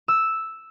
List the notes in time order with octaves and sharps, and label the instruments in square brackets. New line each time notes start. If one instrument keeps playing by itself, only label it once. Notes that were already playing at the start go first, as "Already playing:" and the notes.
[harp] E6